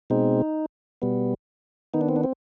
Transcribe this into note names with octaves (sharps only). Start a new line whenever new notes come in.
B2 G#3 C4 D#4
B2 G3 B3
D#3 B3 D#4
D4
C4
D4
C4